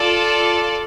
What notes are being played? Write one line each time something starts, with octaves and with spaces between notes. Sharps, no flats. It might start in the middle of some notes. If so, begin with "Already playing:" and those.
Already playing: F4 A4 D5 A5